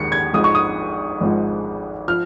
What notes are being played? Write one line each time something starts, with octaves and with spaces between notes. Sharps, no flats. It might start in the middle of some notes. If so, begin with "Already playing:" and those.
Already playing: D#2 D#3 G#3 C#7
G#6
G#1 G#2 F3 G#3 D#6
C#6
D#6
G#1 G#2 F3 G#3
F3 F6